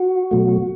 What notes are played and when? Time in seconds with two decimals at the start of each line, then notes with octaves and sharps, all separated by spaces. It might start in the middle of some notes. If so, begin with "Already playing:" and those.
Already playing: F#4
0.31 B2 F#3 A3